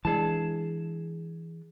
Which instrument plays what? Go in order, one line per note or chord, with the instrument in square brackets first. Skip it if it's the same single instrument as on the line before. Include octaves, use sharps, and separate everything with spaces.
[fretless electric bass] E3 G#3 D4 [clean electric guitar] G#4 A5